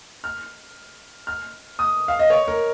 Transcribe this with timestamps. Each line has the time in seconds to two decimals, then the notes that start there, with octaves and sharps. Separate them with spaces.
0.24 F6
1.27 F6
1.79 D#6
2.08 F5
2.19 D#5
2.30 C#5
2.48 A#4